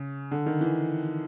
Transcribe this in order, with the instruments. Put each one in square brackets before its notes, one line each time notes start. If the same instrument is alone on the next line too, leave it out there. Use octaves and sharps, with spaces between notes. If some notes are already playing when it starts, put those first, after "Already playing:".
Already playing: [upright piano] C#3
D3
D#3
E3